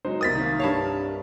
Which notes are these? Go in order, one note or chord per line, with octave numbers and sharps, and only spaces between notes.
F#3 G#3 D#4 C5
C2 A#4 D#6 A6 B6
D#3 A#3
G2 C#5 F5 A5 B5